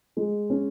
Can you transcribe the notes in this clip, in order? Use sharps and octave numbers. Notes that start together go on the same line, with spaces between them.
G#3
C#4